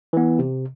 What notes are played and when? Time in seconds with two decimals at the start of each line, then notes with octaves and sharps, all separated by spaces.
0.13 E3 B3
0.39 C3